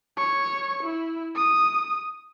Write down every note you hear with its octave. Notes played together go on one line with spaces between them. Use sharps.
C#5 C#6
E4
D#6